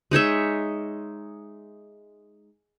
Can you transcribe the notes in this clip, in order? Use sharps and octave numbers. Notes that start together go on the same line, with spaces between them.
G#3 D#4 C#5 E5